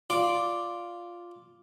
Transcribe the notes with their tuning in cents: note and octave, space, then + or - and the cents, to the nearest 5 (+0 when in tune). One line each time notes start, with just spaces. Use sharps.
F4 +0 D5 +0